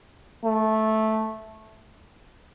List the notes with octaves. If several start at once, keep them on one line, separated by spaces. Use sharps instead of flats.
A3